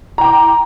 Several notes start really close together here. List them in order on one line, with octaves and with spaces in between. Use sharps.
A#5 G5 D6